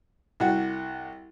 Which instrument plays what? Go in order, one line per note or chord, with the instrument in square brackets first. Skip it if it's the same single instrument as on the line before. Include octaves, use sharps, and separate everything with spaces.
[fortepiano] C2 F#4